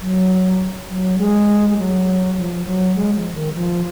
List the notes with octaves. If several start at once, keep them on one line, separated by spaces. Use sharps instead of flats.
F#3
F#3
G#3
G#3
F#3
F3
F#3
G#3
F3
D#3
F3